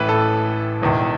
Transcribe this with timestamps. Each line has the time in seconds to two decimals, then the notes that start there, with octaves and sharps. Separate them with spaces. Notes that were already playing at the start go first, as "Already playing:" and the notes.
Already playing: A1 A2 E3 B4
0.09 A4
0.81 E1 E2 D#3